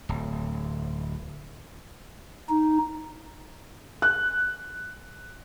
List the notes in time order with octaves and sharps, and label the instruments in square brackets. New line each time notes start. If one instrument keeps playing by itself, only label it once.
[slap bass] D1
[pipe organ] D#4
[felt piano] F#6